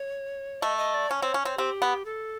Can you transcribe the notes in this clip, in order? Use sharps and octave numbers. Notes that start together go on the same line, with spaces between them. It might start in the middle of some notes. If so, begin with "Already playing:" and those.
Already playing: C#5
A3 D#5
D#5
D5
C#4 C#5
C4
C#4
C4
C4 G4
B3
A4